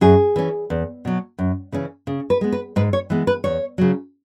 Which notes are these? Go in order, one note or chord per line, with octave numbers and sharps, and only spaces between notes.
F#2 G#4
E3 C#4
E2
B2 F#3
F#2
C#3 E3 C#4
C#3
B4
G#3 B3
B4
G#2 B4
C#5
E3 G#3 B3
B4
E2 C#5
C#3 F#3